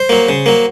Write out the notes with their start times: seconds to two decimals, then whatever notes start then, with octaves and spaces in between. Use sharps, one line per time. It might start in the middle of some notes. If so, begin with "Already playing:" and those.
Already playing: C5
0.09 F#3 A#3
0.29 C#3
0.46 F#3 A#3